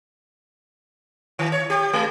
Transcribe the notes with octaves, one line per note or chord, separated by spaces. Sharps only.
D#3
C#5
G4
G#3